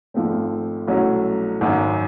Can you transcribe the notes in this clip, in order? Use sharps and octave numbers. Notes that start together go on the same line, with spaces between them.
G#1 G#2 F3 A3 C4
C2 B2 F#3 A3 C#4
G#1 F#2 D#3